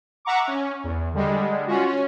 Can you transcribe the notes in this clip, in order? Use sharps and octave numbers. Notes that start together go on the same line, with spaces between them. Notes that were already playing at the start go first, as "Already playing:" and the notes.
E5 F#5 A#5 C#6 D6
C#4
E2
D3 G3 G#3
C#4 F4 F#4
C#4